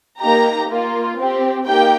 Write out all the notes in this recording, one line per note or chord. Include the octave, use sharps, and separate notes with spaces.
A#3 D#4 G4 A#5
A#3 F4
C4 G4
A#3 D#4 G4 G5